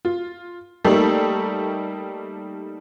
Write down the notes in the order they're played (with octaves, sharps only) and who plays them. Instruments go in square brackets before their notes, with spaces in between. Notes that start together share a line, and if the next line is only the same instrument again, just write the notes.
[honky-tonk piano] F4
G3 A3 A#3 D#4 G4 A4